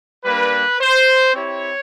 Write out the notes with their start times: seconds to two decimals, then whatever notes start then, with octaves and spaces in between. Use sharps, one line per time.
0.25 G3 A#3 D4 B4
0.80 C5
1.34 C4 E4 G4 C#5